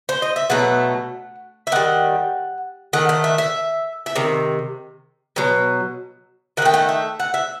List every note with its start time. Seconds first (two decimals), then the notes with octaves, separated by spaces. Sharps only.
0.09 C5
0.22 D#5
0.36 E5
0.50 B2 F#3 A3 F#5
1.67 E5
1.72 D#3 G3 F#5
2.93 D#3 A3 F#5
3.09 F#5
3.24 E5
3.38 E5
4.06 E5
4.15 C3 D#3
5.36 B2 F#3
6.57 D#3 F#5
6.62 A3 G5
6.74 F#5
6.89 E5
7.20 F#5
7.34 E5